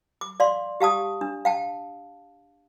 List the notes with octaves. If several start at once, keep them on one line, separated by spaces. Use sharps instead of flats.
D6
D5 F5 C6
G4 F5 A5 D#6
D4
F5 G5 A5